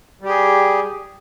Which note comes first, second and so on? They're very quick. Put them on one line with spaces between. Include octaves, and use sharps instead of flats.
G3 G4 G#4